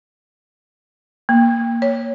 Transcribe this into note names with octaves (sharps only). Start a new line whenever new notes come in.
A#3
C#5